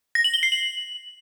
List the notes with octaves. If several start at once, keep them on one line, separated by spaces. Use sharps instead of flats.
A#6
F#7
G7
C7
F#7